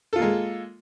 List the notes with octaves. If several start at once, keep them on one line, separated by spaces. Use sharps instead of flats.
G#3 A#3 F4 A4